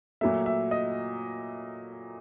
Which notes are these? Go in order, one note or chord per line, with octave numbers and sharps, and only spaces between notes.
A#2 F#3 A3 E5
E5
D#5